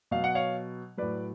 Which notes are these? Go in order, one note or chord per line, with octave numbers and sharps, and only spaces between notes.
B2 F#3 F5
F#5
C#5 F5
A2 F#3 B4 D5